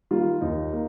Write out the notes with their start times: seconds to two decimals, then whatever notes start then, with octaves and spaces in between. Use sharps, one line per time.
0.11 D#3 G3 A#3 F4
0.41 D#2 D#4
0.73 A#3